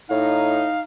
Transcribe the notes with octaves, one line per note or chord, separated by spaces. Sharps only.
A2 D#4 F5